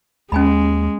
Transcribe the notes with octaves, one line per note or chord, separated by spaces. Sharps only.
D#2 G#3 C#4 G#5 B5